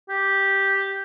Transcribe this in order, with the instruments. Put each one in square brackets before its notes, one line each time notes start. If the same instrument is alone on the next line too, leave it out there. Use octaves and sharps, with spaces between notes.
[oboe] G4